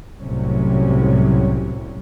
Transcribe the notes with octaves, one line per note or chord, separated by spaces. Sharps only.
C2 A2 C3 F#3 G3 C#4